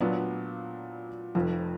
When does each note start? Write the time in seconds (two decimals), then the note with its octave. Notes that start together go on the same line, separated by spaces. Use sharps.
0.01 A#2 F#3 B3 D4
1.35 F1 F2 F3